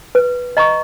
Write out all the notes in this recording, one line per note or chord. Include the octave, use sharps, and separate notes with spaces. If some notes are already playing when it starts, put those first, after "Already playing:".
B4
D#5 A#5 C#6